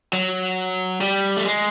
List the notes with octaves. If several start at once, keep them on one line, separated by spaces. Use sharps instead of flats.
F#3
G3
A3
G#3